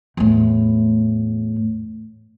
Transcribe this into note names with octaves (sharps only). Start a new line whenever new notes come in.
E2 A2